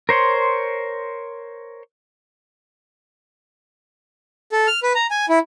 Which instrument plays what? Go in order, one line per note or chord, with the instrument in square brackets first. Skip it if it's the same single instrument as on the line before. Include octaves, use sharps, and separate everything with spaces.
[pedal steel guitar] A#4 C5 C#5 C6
[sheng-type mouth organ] A4
F6
B4
A#5
G#5
E4